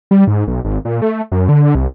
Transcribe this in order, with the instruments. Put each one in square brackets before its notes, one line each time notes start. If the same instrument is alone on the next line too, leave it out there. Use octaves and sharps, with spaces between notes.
[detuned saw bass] G3
G#2
B1
G#1
A#2
A3
F#2
D3
C2